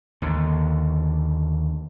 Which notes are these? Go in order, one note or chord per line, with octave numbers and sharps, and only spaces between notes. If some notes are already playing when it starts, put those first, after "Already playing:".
D#2 D3